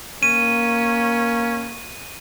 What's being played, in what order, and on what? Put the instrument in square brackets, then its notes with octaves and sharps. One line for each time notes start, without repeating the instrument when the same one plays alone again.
[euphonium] A#3 [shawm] C#4 [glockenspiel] D#7